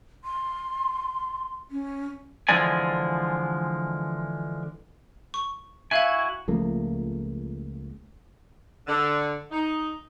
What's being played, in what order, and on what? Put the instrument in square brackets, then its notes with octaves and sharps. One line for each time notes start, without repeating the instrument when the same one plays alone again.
[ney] C6
C#4
[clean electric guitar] D3 E3 F3 G#3 D5 G#5
[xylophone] C#6
[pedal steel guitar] E4 F#4 G#5 [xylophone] E5 F5 G#6
[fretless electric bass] C#2 F3 A3 A#3
[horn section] D3
D#4